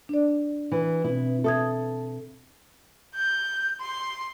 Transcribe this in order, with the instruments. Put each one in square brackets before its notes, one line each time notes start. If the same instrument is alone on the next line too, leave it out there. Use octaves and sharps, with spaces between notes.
[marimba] D4 D5
[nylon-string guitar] E3
[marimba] B2 C4 [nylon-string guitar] E4
[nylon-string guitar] A4 [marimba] E5 D#6 G#6
[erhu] G6
C6